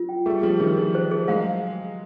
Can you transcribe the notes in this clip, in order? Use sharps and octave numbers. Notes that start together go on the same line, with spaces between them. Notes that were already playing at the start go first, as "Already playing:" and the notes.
Already playing: F#3 F4
G5
G3 A3 G#4
F3 G3 G#4
D#3 F3 G#4
E3 G#4
C5
G#4
F#3 G#3 F5